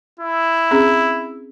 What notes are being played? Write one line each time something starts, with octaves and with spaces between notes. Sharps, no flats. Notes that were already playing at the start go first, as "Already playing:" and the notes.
E4
C4 C#4 G#4